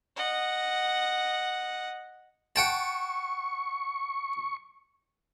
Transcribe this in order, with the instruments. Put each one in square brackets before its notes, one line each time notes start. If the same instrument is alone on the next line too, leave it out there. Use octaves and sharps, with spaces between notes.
[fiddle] D#5 F#5
[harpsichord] F#5 G5 A5 [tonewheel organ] C#6